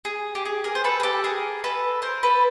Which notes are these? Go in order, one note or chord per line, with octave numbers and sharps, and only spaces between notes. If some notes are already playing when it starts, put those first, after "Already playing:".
G#4
G4
G#4
G#4 A#4
C5
A4 B4
G#4
G4 A4
G#4 A#4
A4 B4
A#4 C5
A4 B4